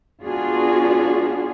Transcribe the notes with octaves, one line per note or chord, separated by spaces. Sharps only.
B3 D4 F4 F#4 G#4